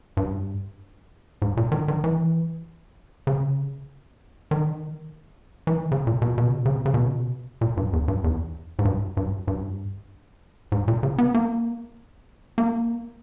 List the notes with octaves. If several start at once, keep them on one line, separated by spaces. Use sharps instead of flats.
G2
G#2
A#2
D#3
D#3
E3
C#3
D#3
E3
D#3
C#3
A#2
B2
B2
C#3
B2
C#3
B2
C#3
B2
C#3
B2
A#2
G2
E2
G2
E2
G#2
G2
G2
G2
G#2
A#2
C#3
B3
A#3
A#3